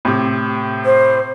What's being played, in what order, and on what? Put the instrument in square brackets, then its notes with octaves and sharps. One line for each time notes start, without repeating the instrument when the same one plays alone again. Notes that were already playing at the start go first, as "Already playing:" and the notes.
[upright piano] A2 C3
[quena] C5